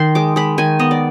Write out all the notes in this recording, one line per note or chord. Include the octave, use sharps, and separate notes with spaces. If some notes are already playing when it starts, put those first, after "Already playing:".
Already playing: D#3 C6
G#3 D6
G#3 B5
D#3 G#5
B3 D#5
D5